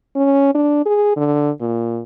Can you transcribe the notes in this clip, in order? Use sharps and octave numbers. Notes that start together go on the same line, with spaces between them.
C#4
D4
G#4
D3
A#2